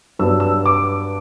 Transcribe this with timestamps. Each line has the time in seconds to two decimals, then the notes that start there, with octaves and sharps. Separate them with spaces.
0.19 G2 F#3 B3 D4 E6
0.40 E6
0.66 D6